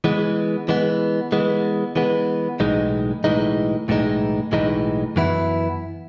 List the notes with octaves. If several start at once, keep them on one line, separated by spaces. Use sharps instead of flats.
E3 G#3 B3
E3 G#3 B3
E3 G#3 B3
E3 G#3 B3
B1 A2 E3 G#3 D#4
B1 A2 E3 G#3 D#4
B1 A2 E3 G#3 D#4
B1 A2 E3 G#3 D#4
F#2 E3 B3 E4